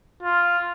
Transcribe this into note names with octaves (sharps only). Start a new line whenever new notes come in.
F4